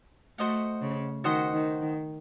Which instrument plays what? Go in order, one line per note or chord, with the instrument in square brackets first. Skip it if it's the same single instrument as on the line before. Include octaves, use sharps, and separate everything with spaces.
[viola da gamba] A3 [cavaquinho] F#4 C5 D#5 F#5
[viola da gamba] C#3
[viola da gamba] D#3 [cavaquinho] F#4 C5 D#5 F#5
[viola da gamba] D#3
D#3